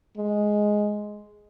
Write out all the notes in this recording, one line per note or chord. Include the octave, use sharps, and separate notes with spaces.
G#3